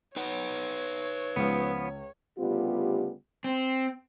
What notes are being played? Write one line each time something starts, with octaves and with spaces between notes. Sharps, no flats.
D#4 B4 C#5 F#5
C#2 F3 B3
D2 C#3 G3 B3 F4 G4
C4